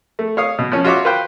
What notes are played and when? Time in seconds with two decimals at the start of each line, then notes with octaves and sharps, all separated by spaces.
0.19 A3
0.37 C#5 F5 D#6
0.59 B2
0.72 F3 C#4
0.84 F4 F#4 C#5 E5 D6
1.05 B4 C5 F5 G5